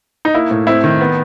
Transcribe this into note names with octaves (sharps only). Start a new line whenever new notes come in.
D#4
A#3 E4
A2
C4 E4
D#3
B3